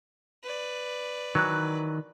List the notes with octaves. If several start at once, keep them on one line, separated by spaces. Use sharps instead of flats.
B4 D5
D#3 E3 F#3 F#6